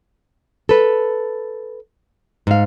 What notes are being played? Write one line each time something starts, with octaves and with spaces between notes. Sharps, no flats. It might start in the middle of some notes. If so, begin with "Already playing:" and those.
A4 B4
G#2 F5